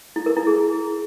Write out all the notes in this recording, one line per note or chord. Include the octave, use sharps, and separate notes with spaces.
E4
A#4
E4
G#4